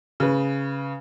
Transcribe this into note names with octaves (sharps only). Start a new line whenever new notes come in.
C#3 B4